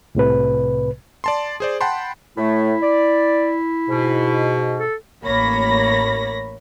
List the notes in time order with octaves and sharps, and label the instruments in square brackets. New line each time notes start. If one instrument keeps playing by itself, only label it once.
[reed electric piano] C2 A2 C3 B4
[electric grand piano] D5 A5 C6
G#4 C5 D5
F#5 G5 A5 B5 C6
[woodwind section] A2 A3 [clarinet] E4
[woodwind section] D5
G#2 B2
[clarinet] A4
[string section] A1 A#3 C#5 B5 A#6